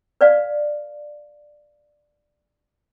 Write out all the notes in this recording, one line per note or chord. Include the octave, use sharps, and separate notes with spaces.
B4 D5 F5